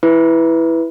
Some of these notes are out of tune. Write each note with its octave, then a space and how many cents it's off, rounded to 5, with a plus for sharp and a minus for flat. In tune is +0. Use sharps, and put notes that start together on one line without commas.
E4 +0 B4 +0